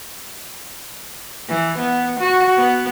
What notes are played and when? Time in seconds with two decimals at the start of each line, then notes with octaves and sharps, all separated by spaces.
1.49 E3
1.78 B3
2.20 F#4
2.58 B3